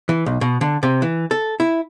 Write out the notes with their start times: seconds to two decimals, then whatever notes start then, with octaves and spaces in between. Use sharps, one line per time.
0.09 E3
0.26 B1
0.41 B2
0.61 D3
0.83 C3
1.02 E3
1.31 A4
1.60 E4